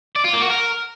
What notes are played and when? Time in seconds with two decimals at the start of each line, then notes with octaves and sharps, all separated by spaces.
0.16 D5
0.25 F4
0.33 A#3
0.42 F#4
0.51 A#4